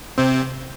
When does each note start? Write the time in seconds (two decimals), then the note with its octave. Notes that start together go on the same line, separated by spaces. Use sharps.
0.18 C3 C4